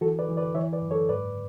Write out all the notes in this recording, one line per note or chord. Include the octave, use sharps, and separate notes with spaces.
E3 F#4 A4
B4 D5
E3
B4 D5
E3 C#5 E5
B4 D5
F#2
A4 C#5
G#2 B4 D5